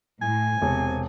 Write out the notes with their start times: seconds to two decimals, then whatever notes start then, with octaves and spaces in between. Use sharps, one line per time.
0.21 A2 G#5
0.62 E1 C3